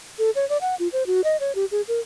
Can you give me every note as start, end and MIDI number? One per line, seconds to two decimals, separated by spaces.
0.19 0.30 69
0.35 0.47 73
0.49 0.58 74
0.61 0.75 78
0.80 0.88 65
0.93 1.03 72
1.07 1.21 66
1.24 1.37 75
1.40 1.52 73
1.55 1.65 67
1.71 1.82 68
1.88 2.00 70